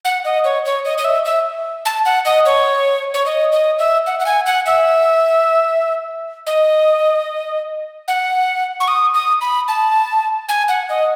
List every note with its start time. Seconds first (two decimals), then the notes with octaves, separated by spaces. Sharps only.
0.05 F#5
0.25 D#5
0.44 C#5
0.65 C#5
0.85 D#5
0.98 D#5
1.04 E5
1.25 E5
1.85 A5
2.05 F#5
2.25 D#5
2.46 C#5
3.14 C#5
3.26 D#5
3.52 D#5
3.79 E5
4.07 F#5
4.20 F#5
4.26 G#5
4.46 F#5
4.66 E5
6.46 D#5
8.08 F#5
8.80 C#6
8.88 D#6
9.14 D#6
9.41 B5
9.68 A5
10.49 G#5
10.68 F#5
10.89 D#5